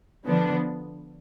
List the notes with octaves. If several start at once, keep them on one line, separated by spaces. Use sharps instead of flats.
D3 F3 B3 D4